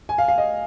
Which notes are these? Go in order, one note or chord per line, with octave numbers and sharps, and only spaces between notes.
G#5
F5
F5
D#5